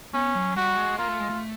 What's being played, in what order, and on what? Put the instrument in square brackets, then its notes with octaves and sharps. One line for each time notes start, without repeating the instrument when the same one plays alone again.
[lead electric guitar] B3 [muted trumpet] C#4
[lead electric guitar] F#3
[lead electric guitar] G3 [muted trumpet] F#4
[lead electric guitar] G#3
[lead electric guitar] A#3 [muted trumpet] F4
[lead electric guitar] A3
G#3
A3